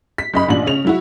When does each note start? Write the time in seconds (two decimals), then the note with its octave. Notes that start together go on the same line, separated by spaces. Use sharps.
0.18 B6
0.34 F#1 D#5 B5
0.48 A1 A#2 D4 F#7
0.66 C#3 C#4 F7
0.85 F#3 E4 F#4